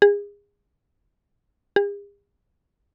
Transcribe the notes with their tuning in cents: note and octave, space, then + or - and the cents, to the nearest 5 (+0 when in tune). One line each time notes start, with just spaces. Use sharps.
G#4 -30
G#4 -45